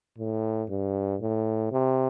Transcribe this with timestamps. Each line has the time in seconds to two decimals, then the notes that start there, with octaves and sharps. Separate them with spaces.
0.18 A2
0.69 G2
1.21 A2
1.72 C3